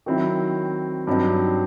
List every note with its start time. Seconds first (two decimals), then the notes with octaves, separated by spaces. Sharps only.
0.06 D#3 F#3 C4 E4
1.07 G2 F#3 C4 D#4